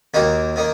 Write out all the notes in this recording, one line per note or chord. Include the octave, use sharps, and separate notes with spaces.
D#2 D#3 A#3 D#4 F#4
D#3 A#3 D#4